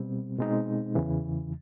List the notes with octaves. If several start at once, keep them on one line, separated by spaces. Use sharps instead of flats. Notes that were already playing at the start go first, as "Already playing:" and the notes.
Already playing: B2 G3 C4
B2 G#3 C4 D#4
E2 C#3 E3